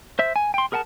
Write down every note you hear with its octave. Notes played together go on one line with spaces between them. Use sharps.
C5 E5
G#5
G5 C6
G#4 A#4 F#5 G#5 A5